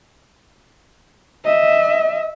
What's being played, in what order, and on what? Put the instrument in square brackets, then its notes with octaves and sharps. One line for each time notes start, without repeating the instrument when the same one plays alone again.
[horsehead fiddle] D#5 E5